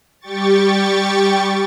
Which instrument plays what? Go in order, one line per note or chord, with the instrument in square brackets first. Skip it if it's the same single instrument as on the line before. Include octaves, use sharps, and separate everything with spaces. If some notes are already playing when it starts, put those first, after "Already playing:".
[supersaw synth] G3 G4 G5 C#6 A6